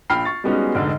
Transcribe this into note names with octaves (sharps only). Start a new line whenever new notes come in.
A#1 G5 B5 F6 C7
C#6 A6
G3 G#3 B3 C#4 D#4 F#4
F1 G#2 D3